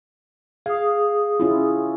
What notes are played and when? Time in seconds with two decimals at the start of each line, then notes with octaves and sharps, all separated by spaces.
0.66 G#4 F5 D#6
1.40 C#4 E4 F4